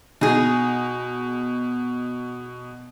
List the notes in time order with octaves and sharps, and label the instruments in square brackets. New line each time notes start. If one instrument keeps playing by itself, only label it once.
[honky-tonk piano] B2 [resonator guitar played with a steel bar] D#4 G#4